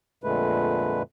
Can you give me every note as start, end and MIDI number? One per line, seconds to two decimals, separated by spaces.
0.24 1.02 41
0.24 1.02 46
0.24 1.02 50
0.24 1.02 56
0.24 1.02 57
0.24 1.02 71